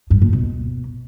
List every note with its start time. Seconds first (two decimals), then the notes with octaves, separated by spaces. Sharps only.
0.10 G2
0.22 A#2
0.33 B2